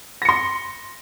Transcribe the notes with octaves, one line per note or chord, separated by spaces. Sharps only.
C6 A#6 C#7